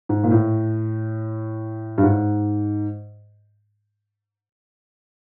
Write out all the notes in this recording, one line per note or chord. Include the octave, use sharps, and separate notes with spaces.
G#2
A#2
A2
G2
G#2